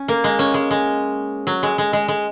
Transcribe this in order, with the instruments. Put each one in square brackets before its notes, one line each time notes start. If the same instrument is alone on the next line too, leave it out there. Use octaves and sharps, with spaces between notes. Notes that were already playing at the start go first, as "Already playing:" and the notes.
Already playing: [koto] C#4
A#3
G#3
C#4
G#3
G#3
F#3
G#3
G#3
G#3
G#3